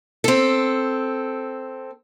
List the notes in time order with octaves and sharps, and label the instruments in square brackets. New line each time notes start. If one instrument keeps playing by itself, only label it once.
[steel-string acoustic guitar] C4 A4